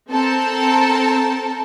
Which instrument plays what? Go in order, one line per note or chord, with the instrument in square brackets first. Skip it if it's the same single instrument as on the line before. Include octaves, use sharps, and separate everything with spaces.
[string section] C4 A4 A#4 A5